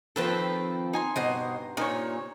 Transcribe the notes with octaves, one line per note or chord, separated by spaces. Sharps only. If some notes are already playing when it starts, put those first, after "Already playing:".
D#3 F3 C4 A4 B4
D#4 G#5 C6
G2 B2 C5 D#5
A#2 D#4 C5 C#5